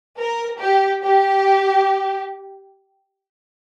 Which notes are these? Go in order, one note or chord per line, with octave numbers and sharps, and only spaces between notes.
A#4
G4
G4